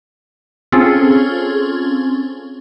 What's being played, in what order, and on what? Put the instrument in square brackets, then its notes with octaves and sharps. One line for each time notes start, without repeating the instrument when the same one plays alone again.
[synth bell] C4 C#4 F4 G#4 A4